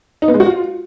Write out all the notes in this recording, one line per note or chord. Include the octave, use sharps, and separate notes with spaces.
D#4
B3
G#3
F#4
F4